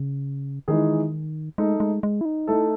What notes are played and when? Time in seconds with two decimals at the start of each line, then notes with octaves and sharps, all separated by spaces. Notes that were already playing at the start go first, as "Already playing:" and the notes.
Already playing: C#3
0.68 D#3 E3 G#3 D#4 G#4
1.58 G#3 A3 D#4 A4
1.80 G#3
2.03 G#3
2.21 E4
2.25 D#4
2.47 A3 D#4 E4 A4